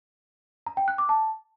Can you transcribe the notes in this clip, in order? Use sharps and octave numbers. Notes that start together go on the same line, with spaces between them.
A#5
G5
F#6
D6
A5